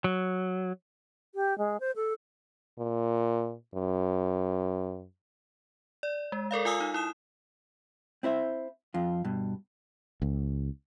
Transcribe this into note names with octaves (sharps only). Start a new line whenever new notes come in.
F#3
G4
G#3
C5
A4
A#2
F#2
D5
G#3
A4 A#4 D5 F5
F4 F5 G#5 D#6 E6
D#4
E4 D#6 E7
C4 E4 C5 E5
F2 F4
G2 B2
C#2